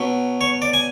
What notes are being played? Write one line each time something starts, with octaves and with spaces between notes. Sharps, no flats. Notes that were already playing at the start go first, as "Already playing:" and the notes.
Already playing: B2 F#3
C#5
D5
G#5